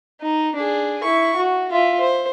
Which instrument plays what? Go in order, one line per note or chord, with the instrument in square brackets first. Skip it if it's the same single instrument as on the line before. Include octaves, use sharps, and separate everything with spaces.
[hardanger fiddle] D#4
D4 G#4
E4 C#6
F#4
F4 E5
C5